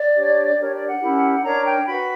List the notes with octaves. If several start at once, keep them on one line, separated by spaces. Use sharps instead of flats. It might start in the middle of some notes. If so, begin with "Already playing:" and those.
Already playing: D5
D4 G4 C#5
D4 G4 A#4 C#5
D5
F#5
C#4 E4 G4 A#4
D4 A#4 C#5 A#5
G5
F#4 B4 B5